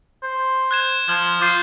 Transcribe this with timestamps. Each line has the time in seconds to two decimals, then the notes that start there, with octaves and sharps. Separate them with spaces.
0.23 C5
0.71 F#6 G#6 E7
1.08 F3 F6 G#6
1.41 F4 D6 G6 C7